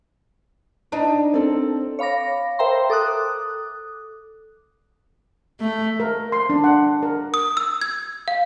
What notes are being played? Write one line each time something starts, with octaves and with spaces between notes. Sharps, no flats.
D4 D#4
C4 A4
C#5 F5 B5 D6 A#6
A#4 C5 E5 G5 A#5 C6
A4 D6 D#6 F#6
A3
A#4
C6
D4
F#5
A#4
D#6
E6
G#6
F5